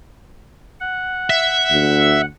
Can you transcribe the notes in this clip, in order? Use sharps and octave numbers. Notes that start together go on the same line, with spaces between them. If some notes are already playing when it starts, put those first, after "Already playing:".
F#5
E5
D2